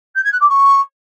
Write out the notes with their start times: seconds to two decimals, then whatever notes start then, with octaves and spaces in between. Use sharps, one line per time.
0.15 G6
0.24 G#6
0.32 F#6
0.40 D6
0.49 C#6